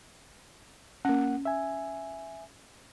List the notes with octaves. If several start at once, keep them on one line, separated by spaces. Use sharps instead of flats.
A#3 C#4 F#5
E5 G#5